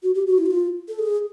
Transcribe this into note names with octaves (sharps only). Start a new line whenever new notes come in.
F#4
G4
F#4
E4
F#4
F4
A4
G#4